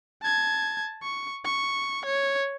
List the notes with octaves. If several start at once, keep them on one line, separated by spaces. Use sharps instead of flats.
A5 G#6
C#6
C#6
C#5